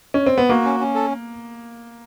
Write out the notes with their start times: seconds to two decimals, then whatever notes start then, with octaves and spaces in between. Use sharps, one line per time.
0.14 C#4
0.26 C4
0.38 B3
0.49 A#3 F#4
0.65 C#4
0.80 C#4
0.95 A4